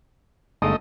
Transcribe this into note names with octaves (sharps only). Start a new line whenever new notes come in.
G1 G#3 A3 D#4 D#5